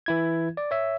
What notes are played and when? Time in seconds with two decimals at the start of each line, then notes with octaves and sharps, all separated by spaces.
0.06 E3 E4 G#6
0.57 D5
0.71 C#5 E5